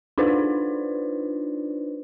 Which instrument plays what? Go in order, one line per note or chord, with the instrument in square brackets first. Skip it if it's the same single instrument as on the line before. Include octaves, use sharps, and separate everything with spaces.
[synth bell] D4 D#4 F4 B4 C5 D5